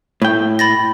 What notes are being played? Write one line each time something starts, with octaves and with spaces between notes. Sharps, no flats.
A2 G5
B5 A6 A#6